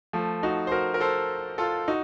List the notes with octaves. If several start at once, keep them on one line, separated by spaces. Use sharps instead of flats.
F3 A3
D#4 F#4
C5
F#4 A#4
A#4
A4 C5
F4 A4
D#4 F#4